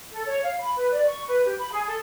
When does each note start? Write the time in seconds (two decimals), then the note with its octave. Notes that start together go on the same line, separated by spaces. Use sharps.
0.11 A4
0.27 C#5
0.43 F5
0.59 B5
0.76 B4
0.92 D5
1.05 C#6
1.27 B4
1.46 G4
1.58 B5
1.72 G#4
1.87 A4